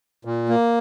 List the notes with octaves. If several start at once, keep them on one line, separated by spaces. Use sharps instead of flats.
A#2
A#3